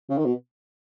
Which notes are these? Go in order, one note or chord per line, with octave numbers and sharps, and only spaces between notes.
C#3
D#3
B2